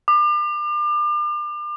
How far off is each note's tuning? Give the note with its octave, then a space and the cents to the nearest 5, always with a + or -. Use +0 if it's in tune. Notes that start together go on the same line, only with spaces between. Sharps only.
D6 +35